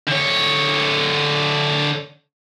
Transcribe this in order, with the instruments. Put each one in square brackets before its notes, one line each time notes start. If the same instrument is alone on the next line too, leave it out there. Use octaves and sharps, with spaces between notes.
[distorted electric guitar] D3 C#5